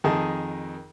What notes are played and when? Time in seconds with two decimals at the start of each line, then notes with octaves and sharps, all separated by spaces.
0.04 F2 D#3 G#4 D#5 A5